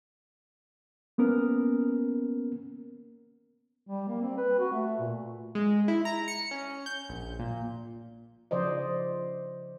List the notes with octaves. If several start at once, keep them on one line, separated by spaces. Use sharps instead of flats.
A#3 B3 C#4 A#4
G3
A#3
C4
B4
F#4
A3
A#2
G#3
E4
A#5
C#7
C#4
G6
A#1
A#2
C#3 F3 C5 D5 D#5